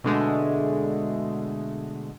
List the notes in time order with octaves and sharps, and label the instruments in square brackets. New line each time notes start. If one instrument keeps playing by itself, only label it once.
[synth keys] B2 D3 G#3 A3